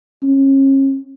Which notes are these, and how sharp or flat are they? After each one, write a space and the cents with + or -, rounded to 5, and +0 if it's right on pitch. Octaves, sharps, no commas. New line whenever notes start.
C#4 -35